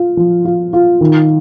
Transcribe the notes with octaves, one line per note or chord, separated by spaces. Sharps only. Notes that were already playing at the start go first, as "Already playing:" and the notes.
Already playing: F4
F3
F4
F4
D#3